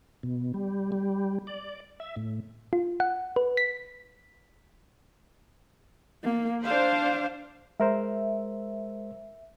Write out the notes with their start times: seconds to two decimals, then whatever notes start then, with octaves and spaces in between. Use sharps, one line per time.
0.23 B2
0.54 G3
0.92 G3
1.47 D5
2.00 E5
2.16 A2
2.73 F4
3.00 F#5
3.36 B4
3.57 B6
6.23 A#3
6.65 D4 C5 F5
7.80 G#3 A#4 C5 E5